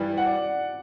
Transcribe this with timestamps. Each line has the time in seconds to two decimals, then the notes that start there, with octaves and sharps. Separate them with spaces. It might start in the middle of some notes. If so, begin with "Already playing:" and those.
Already playing: G2 E3 G3
0.17 F#5
0.26 D5